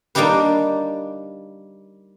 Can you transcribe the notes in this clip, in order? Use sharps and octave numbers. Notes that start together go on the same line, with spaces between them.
G3 A#3 D4 D#4 G4 B4